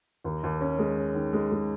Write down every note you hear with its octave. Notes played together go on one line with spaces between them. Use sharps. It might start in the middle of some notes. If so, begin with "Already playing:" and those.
D#2
D#2
C#4
G#3
C#4
D#3
G#3
G#3